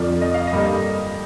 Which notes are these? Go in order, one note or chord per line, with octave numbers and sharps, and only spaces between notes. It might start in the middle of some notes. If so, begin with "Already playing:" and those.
Already playing: F2 D3 F3 D5
D#5
F5
D#5
G2 D3 G3 A#3